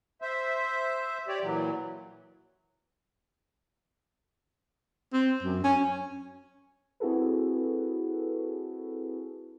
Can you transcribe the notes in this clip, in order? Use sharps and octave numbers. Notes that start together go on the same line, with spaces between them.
C5 E5
G4 C#5 D5
A#2 E3 F#3
C4
F#2
C#4
C4 E4 F#4 G#4 A4 B4